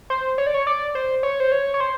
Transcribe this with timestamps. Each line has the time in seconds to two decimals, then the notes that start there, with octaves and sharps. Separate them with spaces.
0.10 C5
0.38 C#5
0.47 D5
0.54 C#5
0.67 D5
0.95 C5
1.23 C#5
1.40 C5
1.52 C#5
1.74 C#5
1.80 C5